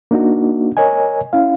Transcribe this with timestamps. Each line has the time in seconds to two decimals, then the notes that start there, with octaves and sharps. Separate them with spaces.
0.11 A#3 D4 D#4 F#4
0.77 A#4 C#5 D#5 G#5
1.33 C#4 E4 F5